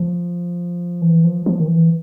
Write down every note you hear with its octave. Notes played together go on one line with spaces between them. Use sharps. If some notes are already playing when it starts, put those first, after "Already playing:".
Already playing: F3
E3
F3
F3
D#3
E3